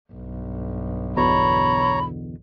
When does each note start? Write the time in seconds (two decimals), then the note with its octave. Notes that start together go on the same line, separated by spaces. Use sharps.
0.12 B1 G2
1.17 E2 B2 D3 C#5 A#5 B5